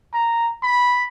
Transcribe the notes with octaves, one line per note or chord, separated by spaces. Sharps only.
A#5
B5